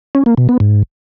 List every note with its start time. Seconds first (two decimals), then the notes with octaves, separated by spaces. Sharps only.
0.15 C#4
0.26 A#3
0.37 B2
0.49 B3
0.60 G#2